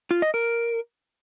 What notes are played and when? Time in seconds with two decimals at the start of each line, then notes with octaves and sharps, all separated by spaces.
0.11 F4
0.22 D#5
0.34 A#4